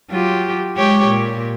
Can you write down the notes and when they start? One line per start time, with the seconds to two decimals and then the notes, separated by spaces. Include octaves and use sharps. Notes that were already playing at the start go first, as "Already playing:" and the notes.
0.10 F#3 F4 G4
0.77 G#3 G4 C#5
1.07 A#2